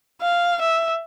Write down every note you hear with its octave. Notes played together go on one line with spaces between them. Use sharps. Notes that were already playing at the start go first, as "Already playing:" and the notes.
F5
E5